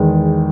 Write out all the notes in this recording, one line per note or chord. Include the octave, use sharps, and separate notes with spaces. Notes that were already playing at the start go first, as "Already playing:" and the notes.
Already playing: E2 D#3 G#3